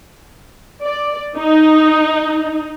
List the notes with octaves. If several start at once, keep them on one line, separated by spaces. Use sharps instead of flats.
D5
D#4